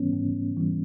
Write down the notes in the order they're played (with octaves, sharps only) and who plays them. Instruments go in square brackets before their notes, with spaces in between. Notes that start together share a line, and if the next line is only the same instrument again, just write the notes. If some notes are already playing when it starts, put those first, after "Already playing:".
Already playing: [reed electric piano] G#2 E3 G3 B3 C#4
G#2
E3 G3